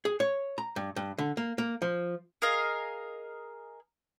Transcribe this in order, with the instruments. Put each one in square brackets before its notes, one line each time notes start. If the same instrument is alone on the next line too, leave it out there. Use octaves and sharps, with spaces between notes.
[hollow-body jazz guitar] G#4
C#5
A#5
G2
G2
D3
A#3
A#3
F3
[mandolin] G#4 A#4 D#5 F5